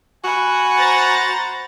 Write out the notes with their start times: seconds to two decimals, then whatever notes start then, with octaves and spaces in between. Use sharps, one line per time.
0.24 F#4 F#5 G#5 B5
0.78 C5 A#5 A6